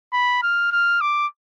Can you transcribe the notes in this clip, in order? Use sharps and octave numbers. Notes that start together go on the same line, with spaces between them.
B5
F6
F6
D6